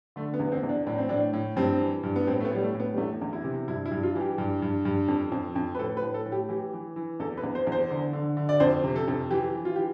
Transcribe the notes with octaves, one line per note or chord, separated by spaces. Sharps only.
D3 A3
B3
E2
B3
C4
E2
D4
A2 D4
C4
A2 D4
A2
G2 C4
E3
G2
B3
A2 C4
A3
B3
A2 G3
A3
A2
B3
G3
E2 A3
E2
E4
C3
G2 E4
E4
G2
F4
E3
G4
G2
G2
G2
F2
F2
F2
B4
A2 A4
B4
A2
A4
A2
G4
E3 G4
E3
E3
E2 A4
B4
E2
C5
E2
C5
D3
D3
D3
D5
F2 C5
C3
A4
F2
E3 G4
E3
F4
E3 G4